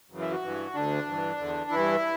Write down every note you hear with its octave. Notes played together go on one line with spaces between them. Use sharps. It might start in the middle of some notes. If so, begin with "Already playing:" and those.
F#2 C#3 E3
E4
F#4
G2 E3
D2 D3 D4
G2 E3
E2 D3
G2 E3 E4